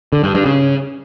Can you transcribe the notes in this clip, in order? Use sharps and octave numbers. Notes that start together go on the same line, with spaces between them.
D3
G2
G2
C#3